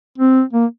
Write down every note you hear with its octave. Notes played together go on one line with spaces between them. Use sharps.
C4
A#3